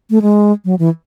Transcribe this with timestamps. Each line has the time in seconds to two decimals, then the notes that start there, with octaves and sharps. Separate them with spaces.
0.10 A3
0.22 G#3
0.65 F#3
0.79 E3